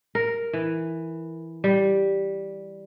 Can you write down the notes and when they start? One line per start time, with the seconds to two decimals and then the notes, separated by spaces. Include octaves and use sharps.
0.15 A#4
0.53 E3
1.64 G3